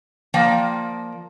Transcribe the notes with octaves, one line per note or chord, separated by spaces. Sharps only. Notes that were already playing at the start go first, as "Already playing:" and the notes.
F3 A#3 D5 G5